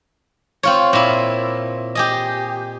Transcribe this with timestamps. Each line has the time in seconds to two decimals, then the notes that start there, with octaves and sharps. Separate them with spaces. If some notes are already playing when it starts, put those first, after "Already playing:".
0.63 C4 F4 C#5
0.93 A#2 E4
1.95 G4 G#4 D#5